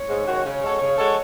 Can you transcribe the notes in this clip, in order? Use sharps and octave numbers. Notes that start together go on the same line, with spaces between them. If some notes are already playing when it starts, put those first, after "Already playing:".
Already playing: C#5
G#2
D#3 G#3 C#4 F#4
C#3 C#5
G#3 C#4 F#4 A4
C#3
G#3 C#4 F#4 A4